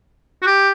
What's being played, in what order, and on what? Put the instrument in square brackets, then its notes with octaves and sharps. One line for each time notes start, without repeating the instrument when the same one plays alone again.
[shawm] F#4
G4